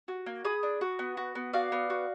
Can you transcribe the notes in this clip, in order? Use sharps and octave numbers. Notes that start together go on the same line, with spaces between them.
F#4
A#3
G#4 B5 D#6
D4
F#4
B3
F#4
B3
F#4 D5 F5
B3
F#4